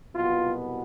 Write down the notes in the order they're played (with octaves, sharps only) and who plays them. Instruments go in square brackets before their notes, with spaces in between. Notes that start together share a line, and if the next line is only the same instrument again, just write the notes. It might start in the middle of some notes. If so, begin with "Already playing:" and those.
[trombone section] C2 B2 F#3 B3 F4